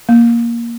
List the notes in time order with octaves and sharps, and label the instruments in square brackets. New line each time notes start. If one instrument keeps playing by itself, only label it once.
[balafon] A#3